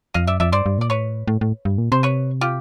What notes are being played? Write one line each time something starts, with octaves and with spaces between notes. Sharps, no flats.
F2 D#5 F5
F#2 D5 E5
F2 D5 E5
G2 C5 D5
G2
A#2 D5
A2 B4 C#5
A2
A2
G2
A#2
C3 C5
B4 C#5
F4 G4